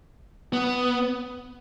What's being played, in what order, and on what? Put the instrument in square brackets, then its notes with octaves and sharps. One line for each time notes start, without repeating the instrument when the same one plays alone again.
[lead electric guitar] B3